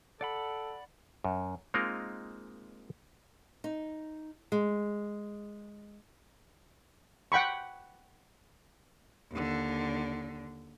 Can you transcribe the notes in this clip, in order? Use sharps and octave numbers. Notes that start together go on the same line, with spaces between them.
A4 D5 F#5 B5
F#2
G#3 A#3 C4 D#4 F4 A#4
D#4
G#3
F#5 G5 B5 C#6
D#2 D3